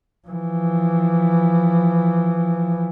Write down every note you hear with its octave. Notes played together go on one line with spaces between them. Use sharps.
E3 F3